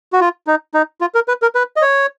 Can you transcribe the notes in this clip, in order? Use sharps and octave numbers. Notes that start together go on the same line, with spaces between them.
F#4
F4
D#4
D#4
F4
A#4
B4
A#4
B4
D#5
C#5